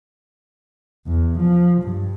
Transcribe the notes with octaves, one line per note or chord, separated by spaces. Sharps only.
E2
F3
G2